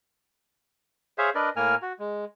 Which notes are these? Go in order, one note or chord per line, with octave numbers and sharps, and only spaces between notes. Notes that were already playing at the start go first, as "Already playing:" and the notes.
G#4 C5 C#5 E5 F5
D4 A#4 B4 D5 D#5
A2 A#3 A#4 G#5 F6
F#4
G#3